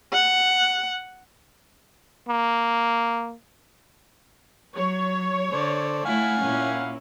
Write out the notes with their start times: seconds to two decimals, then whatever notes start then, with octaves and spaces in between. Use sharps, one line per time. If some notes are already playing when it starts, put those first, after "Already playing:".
0.13 F#5
2.28 A#3
4.75 F#3 C#5
5.52 D3 A4 C5 D5
6.05 A3 E4 F5 F#5 G#5
6.41 A#2 A#3 C#4 E4